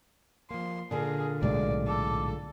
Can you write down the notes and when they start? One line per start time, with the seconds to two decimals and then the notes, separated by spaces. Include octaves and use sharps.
0.51 F3 A#3 C6
0.91 A#2 D3 D4 G#4 A#4
1.43 B1 A2 G#3 D5
1.87 A4 D6